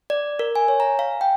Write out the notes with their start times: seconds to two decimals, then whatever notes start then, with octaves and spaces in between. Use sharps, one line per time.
0.10 D5
0.39 A#4
0.56 G#5
0.68 C#5
0.80 A#5
0.99 F5
1.21 G5